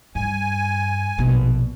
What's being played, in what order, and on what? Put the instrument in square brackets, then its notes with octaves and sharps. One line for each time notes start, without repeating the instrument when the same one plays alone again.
[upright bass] G2 [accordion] G#5
[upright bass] A#1 B2